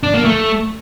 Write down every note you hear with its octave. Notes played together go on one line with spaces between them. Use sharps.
D4
A#3
A3